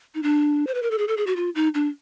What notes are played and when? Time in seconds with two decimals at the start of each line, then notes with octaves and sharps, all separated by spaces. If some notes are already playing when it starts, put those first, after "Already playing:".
0.15 D#4
0.23 D4
0.67 C5
0.74 B4
0.83 A#4
0.91 A4
0.98 G#4
1.08 A4
1.17 G#4
1.27 F#4
1.36 F4
1.55 D#4
1.75 D4